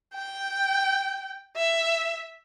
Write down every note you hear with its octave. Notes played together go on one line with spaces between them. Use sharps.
G5
E5